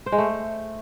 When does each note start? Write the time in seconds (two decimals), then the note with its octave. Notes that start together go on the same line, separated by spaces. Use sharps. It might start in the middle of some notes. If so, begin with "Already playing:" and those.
0.06 C5
0.12 G#3
0.18 A3